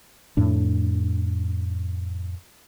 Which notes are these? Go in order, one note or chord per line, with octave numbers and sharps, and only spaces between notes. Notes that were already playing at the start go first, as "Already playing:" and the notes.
F2 A2 D4